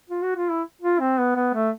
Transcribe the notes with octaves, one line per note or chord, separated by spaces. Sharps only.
F4
F#4
F4
E4
F4
C4
B3
B3
A3